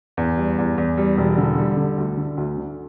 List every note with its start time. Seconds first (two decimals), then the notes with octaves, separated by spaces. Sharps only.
0.17 E2
0.37 G3
0.58 E2
0.78 E2
0.98 G3
1.18 E1
1.37 D3
1.58 G3
1.77 D3
1.97 D2
2.17 D3
2.37 D2
2.57 D3